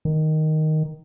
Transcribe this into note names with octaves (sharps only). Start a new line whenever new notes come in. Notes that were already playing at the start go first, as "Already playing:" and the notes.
D#3